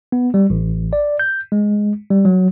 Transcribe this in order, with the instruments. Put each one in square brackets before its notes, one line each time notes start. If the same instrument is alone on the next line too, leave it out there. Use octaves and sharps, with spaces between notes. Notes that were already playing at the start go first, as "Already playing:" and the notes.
[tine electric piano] B3
G3
A1
D5
G6
G#3
G3
F#3